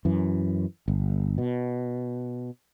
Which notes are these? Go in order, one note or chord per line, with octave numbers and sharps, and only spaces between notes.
F#2 E3
G1
B2